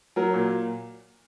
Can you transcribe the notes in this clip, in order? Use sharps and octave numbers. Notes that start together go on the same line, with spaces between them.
F#3 A#4
A#2